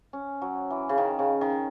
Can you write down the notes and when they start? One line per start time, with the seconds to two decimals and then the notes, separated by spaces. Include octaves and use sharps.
0.13 C#4
0.42 F#3
0.71 E3
0.89 C#3
0.98 D#3
1.19 C#3
1.41 D#3